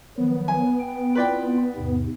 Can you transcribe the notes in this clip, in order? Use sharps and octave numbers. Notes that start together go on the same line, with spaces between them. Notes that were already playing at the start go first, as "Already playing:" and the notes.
D#3 F3 F#3 B3
G#5
G5
C4 E4 F4 B4 D5 G5
E2 G#2 C3